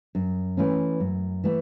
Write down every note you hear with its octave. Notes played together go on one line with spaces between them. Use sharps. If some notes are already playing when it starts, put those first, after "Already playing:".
F#2
E3 A3 C#4
F#2
E3 A3